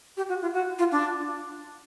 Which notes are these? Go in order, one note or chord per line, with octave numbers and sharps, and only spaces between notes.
G4
F#4
F4
F#4
F4
D4